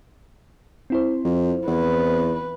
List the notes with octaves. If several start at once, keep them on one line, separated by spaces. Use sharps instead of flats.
C4 E4 C5
F2
E2 B4